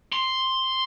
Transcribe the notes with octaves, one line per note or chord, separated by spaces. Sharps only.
C6